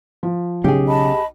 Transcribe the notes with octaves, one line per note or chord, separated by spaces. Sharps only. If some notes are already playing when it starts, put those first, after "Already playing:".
F3
B1 C#3 G4 G#4
D#5 A5 B5